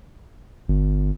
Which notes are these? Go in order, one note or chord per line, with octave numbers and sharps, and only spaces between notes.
G1